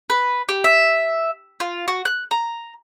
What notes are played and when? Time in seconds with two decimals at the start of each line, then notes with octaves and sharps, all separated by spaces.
0.10 B4
0.49 G4
0.64 E5
1.60 F4
1.88 F#4
2.05 F#6
2.31 A#5